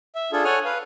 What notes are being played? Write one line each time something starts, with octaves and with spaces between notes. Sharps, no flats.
E5
D4 F4 G#4 A4
A4 C#5 F#5 G#5 F6
B4 F5